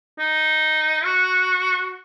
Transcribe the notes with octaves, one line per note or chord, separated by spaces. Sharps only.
D#4
F#4